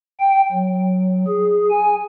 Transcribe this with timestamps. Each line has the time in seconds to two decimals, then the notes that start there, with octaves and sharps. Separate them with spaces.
0.20 G5
0.52 F#3
1.27 G#4
1.71 G#5